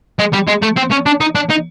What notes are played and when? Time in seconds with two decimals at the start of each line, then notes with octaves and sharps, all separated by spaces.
0.19 G#3
0.33 G3
0.48 G#3
0.62 A3
0.77 C4
0.91 C#4
1.06 D4
1.21 D#4
1.35 D4
1.50 D#4